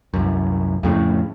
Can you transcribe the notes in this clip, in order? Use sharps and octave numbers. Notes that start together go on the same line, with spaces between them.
C2 F#2
F2 A2 C#3